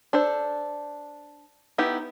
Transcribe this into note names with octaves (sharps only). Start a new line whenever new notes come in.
D4 A4 C5
B3 D#4 E4 G4